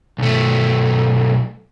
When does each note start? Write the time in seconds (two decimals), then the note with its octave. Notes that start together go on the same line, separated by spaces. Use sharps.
0.18 B1 A3